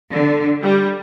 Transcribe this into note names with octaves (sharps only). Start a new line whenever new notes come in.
D3
G3